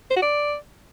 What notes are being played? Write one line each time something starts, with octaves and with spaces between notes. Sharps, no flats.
C5
F#4
D5